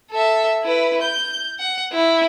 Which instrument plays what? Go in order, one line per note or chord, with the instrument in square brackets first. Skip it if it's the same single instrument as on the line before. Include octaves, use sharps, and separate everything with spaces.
[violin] A4 E5
E4 B4
G6
F#5
E4